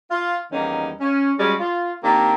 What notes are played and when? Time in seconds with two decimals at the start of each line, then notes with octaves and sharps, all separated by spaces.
0.11 F4
0.52 E2 D#3 G3 A#3 C#4 D#4
1.00 C#4
1.39 G3 G#3 C#4 F#4 G#4 D5
1.60 F4
2.03 D#3 A#3 C4 D4 G4